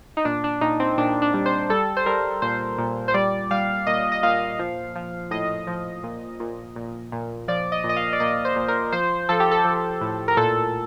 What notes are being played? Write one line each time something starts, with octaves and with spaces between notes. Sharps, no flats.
D#4
A#2 D4
D4
A#2 D#4
C4
A#2 D4
D4
G3
C5
G3 A4
C5
G3 A#4
A#2 C5
A#2
C5
G3 D5
G3 F5
A#2 D#5
D#5
A#2 F5
F3
F3
A2 D#5
F3
A#2
A#2
A#2
A#2
F3 D5
D#5
A#2
D#5
F5
D5
A#2 D#5
C5
A#2
A#4
F3 C5
F3 A4
G4
A4
F3
A2
A#4
A#2 A4